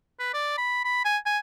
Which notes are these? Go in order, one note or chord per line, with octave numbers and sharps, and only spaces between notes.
B4
D5
B5
B5
G#5
G#5